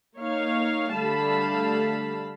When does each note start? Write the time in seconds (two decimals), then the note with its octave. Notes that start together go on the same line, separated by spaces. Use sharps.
0.17 A#3 D#4 C#5 F5
0.94 D3 G3 A3 F5 A5 B5